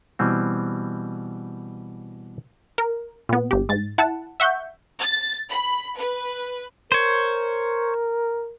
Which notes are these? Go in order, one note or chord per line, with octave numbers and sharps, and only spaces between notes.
B2 E3 G3 C4
A#4
A#2 B3
G1 G4
G#2 A6
E4 F#5 A5
E5 F#5 C#6 G6
A6
B5
B4
A#4 C5 C#5